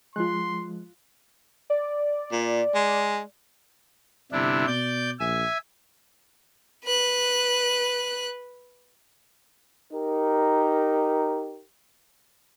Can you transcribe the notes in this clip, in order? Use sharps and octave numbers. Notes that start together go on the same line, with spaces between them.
F3 G#3 F4 C6 F#6
D5
A#2
G#3
G1 C3 D4 E4
B2 D5 G6
A#1 E5 G#5
B4 F#6
D#4 G4 A#4